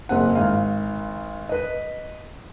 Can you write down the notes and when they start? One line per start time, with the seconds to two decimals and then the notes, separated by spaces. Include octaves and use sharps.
0.09 F#1 C4 F#5
0.35 G#1 F5
1.49 B4 D#5